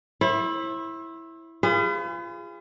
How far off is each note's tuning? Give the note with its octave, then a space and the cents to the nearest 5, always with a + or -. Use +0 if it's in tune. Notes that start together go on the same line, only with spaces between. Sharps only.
E4 +0 C5 +45
F4 -25 G#4 -30 B4 +40